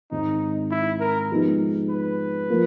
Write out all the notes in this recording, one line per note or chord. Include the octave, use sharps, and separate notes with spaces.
G#2 D#3 G#3 C4 D#4
E4
A#4
F3 G#3 B3 D#4 G4
B4
F3 A#3